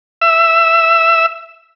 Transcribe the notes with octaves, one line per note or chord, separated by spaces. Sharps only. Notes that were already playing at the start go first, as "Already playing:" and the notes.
E5 E6